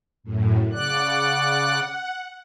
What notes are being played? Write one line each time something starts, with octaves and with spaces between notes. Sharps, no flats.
F#2 A2
C#3 D5 F#5 F#6